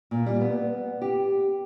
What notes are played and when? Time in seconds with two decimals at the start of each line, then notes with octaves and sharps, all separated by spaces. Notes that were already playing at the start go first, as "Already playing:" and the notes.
0.11 A#2
0.26 G3
0.41 B3
1.02 G4